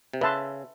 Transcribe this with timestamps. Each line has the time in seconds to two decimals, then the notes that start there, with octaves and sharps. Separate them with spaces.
0.14 C3
0.21 C#3 B4 E5 A5 C6